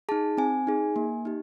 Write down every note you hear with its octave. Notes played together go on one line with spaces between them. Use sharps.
D#4 G#4 A5
C4 G#5
D#4 G#4
A#3
D#4 G4